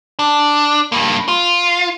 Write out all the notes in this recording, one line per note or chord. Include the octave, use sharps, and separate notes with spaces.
D4
G2 A#3
F4